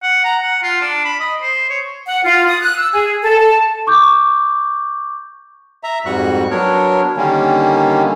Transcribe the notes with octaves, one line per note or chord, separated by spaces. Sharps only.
F#5
A#5
F#5
F4
D4
B5
D#5
C5
C#5
F#5
F4
D#6
F#6
E6
G#4
A4
A5
C#6 D6 G6
E5 A#5
F2 G#2 G3 F#4 C#6 F#6
F#3 B3 D4 A#4 C#5
D3 D#3 G3 A#3 C#4